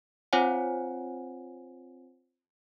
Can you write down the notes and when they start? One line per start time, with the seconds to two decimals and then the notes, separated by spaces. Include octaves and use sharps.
0.33 C4 F4 C5 C#5 F#5 G#5